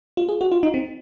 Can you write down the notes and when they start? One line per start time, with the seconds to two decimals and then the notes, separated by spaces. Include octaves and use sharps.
0.17 F4
0.29 G#4
0.41 F#4
0.52 F4
0.63 D#4
0.74 C4